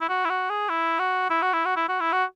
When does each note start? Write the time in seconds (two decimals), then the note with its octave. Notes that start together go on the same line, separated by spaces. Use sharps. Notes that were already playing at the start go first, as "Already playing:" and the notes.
0.01 E4
0.09 F#4
0.25 E4
0.30 F#4
0.50 G#4
0.70 E4
0.99 F#4
1.30 E4
1.42 F#4
1.53 E4
1.65 F#4
1.76 E4
1.89 F#4
2.00 E4
2.12 F#4